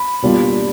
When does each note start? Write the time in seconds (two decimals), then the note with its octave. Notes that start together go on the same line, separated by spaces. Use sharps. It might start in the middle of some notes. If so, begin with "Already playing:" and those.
Already playing: B5
0.22 B2 G3 A#3 D4 F4